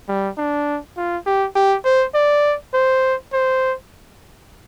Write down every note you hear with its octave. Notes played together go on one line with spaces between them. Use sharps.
G3
D4
F4
G4
G4
C5
D5
C5
C5